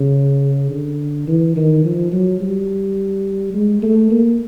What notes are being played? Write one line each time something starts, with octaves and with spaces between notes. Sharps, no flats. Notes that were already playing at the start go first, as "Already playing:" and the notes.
Already playing: C#3
D3
E3
D#3
F3
F#3
G3
G#3
A3
A#3